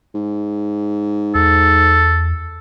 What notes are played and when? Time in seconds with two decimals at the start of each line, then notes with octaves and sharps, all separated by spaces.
0.15 G#2
1.35 E2 A4